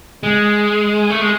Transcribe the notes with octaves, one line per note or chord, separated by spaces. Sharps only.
G#3
A3
G#3